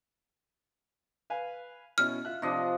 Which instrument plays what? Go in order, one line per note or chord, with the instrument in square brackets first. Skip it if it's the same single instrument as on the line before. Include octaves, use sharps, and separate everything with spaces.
[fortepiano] B4 F5 G#5
[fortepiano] B2 C#4 E4 [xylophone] F6
[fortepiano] F4 E5 F#6
[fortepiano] C3 [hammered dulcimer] F3 D4 D#5